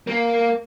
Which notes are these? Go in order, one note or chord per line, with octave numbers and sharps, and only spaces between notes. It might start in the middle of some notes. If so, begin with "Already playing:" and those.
A#3